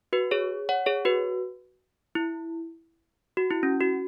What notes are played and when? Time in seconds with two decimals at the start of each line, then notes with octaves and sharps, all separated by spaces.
0.13 F#4 B4
0.31 G#4 C#5
0.69 C#5 F#5
0.86 G#4 C#5
1.05 F#4 B4
2.15 E4
3.37 F#4
3.51 E4
3.63 C#4
3.81 F#4